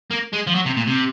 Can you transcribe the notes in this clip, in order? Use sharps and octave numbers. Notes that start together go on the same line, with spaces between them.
A#3
G#3
F3
F#3
C3
A#2
C3